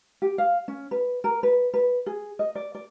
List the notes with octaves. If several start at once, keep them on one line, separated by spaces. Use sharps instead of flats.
G4
F5
C#4
B4
A#4
B4
B4
G#4
D#5
D5
D5